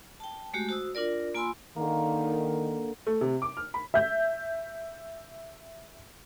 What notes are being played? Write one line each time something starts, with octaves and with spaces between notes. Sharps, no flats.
G5 A5
G#3 A3 F#4 G4
F#4 C5 D#6 E6
D4 F4 A#4 D5
A#3 F4 G#5 B5 C6 E6
D3 D#3 A#3
A3
C3
D6
F6
B5
E5 G6